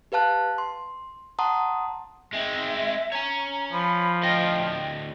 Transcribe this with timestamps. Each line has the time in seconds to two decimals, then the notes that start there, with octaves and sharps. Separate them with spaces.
0.12 G4 B4 F5 A5 F#6
0.58 C6
1.39 F#5 A5 A#5 C6 D#6
2.33 G#3 C4 E5
3.12 C#5 G#5 A#5
3.73 F3 B5
4.23 D2 D#5 G5